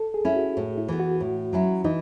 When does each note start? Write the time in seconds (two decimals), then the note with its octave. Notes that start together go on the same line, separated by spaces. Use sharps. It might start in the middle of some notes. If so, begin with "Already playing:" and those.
Already playing: A4
0.14 G#4
0.25 C#4 E4
0.36 F#4
0.57 A2
0.78 E4
0.88 E3 B3
1.00 F#4
1.20 A2
1.53 F#3 C#4 E4
1.84 E3 D#4